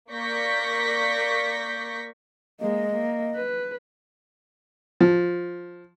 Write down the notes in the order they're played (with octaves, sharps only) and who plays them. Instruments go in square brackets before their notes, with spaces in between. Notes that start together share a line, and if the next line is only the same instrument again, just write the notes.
[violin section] A#3 D5 C#6 G6 A#6 B6
[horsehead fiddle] G#3 A#3 [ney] D#5
[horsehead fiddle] A#3
B4
[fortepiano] F3